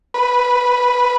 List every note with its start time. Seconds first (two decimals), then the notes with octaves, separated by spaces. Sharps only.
0.14 B4